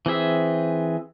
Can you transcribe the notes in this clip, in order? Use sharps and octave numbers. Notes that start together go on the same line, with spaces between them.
E3 C4 G#4 E5